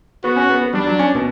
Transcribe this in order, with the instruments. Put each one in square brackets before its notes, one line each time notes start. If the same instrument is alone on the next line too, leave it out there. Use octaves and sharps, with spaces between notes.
[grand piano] B3 [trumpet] F#4
[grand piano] C#4
B3
B3
[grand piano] G3 [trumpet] D4
[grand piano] F#3
C#4
B2